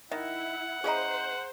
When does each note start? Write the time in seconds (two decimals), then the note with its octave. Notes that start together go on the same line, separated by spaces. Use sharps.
0.11 D#3 E4 E5 F#5
0.84 C#4 E4 G#4 C5 D#5 F5 A#5